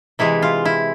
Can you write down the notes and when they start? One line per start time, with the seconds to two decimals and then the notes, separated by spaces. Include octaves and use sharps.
0.19 C3 E3 G#3 E4
0.42 F4
0.65 E4